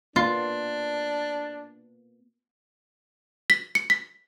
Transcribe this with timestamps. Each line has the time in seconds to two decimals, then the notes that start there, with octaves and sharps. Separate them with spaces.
0.16 A#3 B3 D4 F4
3.50 B6
3.75 C#7
3.90 B6